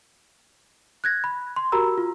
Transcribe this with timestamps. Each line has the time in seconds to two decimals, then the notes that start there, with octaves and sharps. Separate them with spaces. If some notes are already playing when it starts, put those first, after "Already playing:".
1.04 F#6 G#6 A#6
1.24 B5
1.56 C6
1.72 F#4 G4 A#4 A#5 B5 E6
1.98 F4